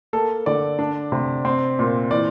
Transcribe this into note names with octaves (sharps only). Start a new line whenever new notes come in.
A#3 A4
D3 D5
D4
C3
C4
A#2
E3 D5